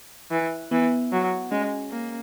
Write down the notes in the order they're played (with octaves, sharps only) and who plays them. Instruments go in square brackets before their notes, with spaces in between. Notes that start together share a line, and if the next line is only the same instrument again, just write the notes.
[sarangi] E3
[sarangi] E3 [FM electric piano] B3
[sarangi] F#3
[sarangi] G#3 [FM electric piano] C#4
[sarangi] A#3